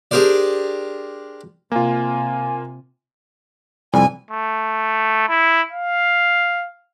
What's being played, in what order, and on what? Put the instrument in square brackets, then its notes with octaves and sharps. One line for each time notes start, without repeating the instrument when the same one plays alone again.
[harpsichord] D4 G4 G#4 A#4 C5 D5
[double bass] C3 [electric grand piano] A#3 F4 [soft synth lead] G#5
[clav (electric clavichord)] C2 F2 G3 [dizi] G#5
[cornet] A3
E4
F5